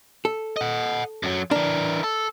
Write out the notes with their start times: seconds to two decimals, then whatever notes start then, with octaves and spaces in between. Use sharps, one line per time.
0.25 A4
0.57 D#5 F#5
1.23 F#2 F#3
1.51 E3 D4 A#4
2.04 A4